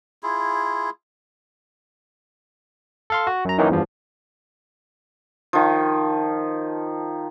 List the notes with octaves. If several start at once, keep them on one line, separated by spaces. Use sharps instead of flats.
E4 F4 G#4
A4 F5 C6
F#4
F#2 A#5
F#2 D#3 E3 F#3 A#3 D#4
E2 G2 F3
D#3 F3